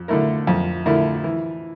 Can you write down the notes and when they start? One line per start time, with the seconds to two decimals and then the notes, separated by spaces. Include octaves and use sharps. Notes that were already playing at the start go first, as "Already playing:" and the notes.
Already playing: F2
0.08 D3 A3 E4 A#4
0.47 F2
0.86 D3 A3 E4 A#4
1.24 E3